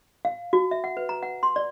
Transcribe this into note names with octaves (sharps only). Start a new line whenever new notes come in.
F5
F#4
E5
F#5
B4
A#5
F#5
C6
D5